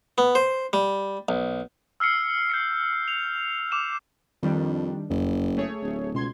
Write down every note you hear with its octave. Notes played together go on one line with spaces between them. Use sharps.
B3
C5
G3
B1
E6 F6 C7 C#7
G6 C7 C#7
F7
D6 E7 F7
F2 D#3 G3 D4
F#1 F2
A3 G#4 C#5
D1
C#2 B2 C6 G#6